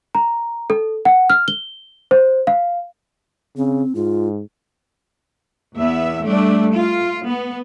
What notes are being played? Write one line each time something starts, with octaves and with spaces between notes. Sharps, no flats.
A#5
A4
F#5
F6
G7
C5
F5
C#3 C4
G#2 F4
E2 B3 E5
G3 A3 D4
F4
B3